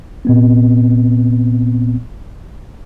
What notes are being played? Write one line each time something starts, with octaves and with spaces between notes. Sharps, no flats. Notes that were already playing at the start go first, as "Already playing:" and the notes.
A#2 B3 C4